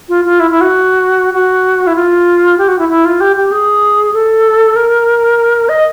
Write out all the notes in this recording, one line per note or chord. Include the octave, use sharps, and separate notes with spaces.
F4
F4
E4
E4
F#4
F#4
E4
F4
G4
F#4
E4
E4
F4
G4
G4
G#4
A4
A#4
D#5